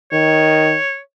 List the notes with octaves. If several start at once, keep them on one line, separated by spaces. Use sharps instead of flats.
D#3 C#5